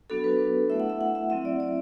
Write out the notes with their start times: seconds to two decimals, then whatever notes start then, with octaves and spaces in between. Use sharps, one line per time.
0.10 F#3 B3 D4 F#4 A4
0.24 B4
0.70 A3 E4 E5
0.80 F#5
0.90 E5
1.01 F#5
1.15 E5
1.30 F#3 C4 E4 E5
1.45 D5
1.60 D5